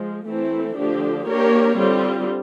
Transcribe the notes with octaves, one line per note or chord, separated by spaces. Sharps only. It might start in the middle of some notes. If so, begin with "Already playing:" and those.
Already playing: F3 G#3
E3 A3 C4 E4 A4
D3 F3 A3 D4 G4
A#3 D4 G4 A#4 C#5
D3 G3 C4 F4